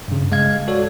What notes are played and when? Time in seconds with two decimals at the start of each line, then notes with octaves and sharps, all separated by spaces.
0.08 G2 C#3
0.32 G#3 F5 G#6
0.68 F#4 A4 C#5 D5